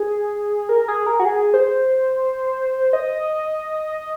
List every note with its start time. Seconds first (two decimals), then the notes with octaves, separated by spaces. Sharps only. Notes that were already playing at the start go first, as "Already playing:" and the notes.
Already playing: G#4
0.69 A#4
0.88 G#4
1.06 A#4
1.20 F#4
1.25 G#4
1.54 C5
2.93 D#5